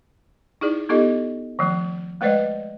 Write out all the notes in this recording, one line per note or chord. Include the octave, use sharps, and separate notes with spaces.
D#4 E4 G#4 D5
B3 D#4 F4 G4 A4 D#5
D#3 F3 A3
G#3 A3 B4 C5 D5 D#5